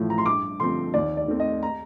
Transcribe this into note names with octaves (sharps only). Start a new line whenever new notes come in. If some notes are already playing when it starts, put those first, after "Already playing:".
Already playing: A1 A2 F3
A#5
C6
G2 D6
D3 F3 C4 C6
D#2 D5
D5
D#3 A3 C4
D#5
A#5